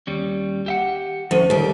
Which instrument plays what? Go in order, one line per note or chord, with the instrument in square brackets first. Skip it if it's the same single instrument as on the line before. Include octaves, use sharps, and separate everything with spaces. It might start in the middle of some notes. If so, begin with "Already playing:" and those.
[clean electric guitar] D#2 G3 C#4
G4 E5 F#5
[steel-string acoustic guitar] D2 [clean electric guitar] F3 C#4
[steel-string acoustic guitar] D#2 G4 [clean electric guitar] D#3 G3